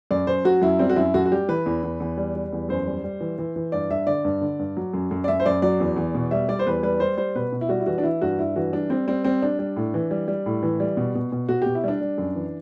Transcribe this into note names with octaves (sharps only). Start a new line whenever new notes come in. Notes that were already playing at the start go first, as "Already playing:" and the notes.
F#2 D5
F#2 C5
F#3 F#4
F#2 E4
G3 C4
F#4
F#2 E4
F#2 F#4
F#4
G3 G4
E3 B4
E2
E2
E2
G3
G3
E2
F#2 C5
G3
G3
E3
E3
E3
G2 D5
G2 E5
D3 D5
G2
D3
G2
F#3
F#2
F#2
D5
F#2 E5
C5
F#2 D5
F#3 D5
E2
E2
B2
G3 E5
G3 D5
C5
E2 B4
G3 B4
G3 C5
G3 C5
B2 B4
B2
E4
G3 F#4
E4
E3 F#4
D4
E3 E4
G2 F#4
G2 E4
E3 F#4
G3 D4
G3 C4
G3 C4
G3 C4
G3 D4
G3
A2
E3
G3
G3
A2
E3
G3
B2
B2
B2
B2 F#4
B2 G4
E4
G3 D4
G3
F#2
E3